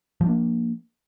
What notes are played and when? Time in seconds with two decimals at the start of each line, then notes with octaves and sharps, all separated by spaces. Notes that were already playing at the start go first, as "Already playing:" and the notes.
0.21 F3
0.23 G3
0.26 D4
0.29 A#3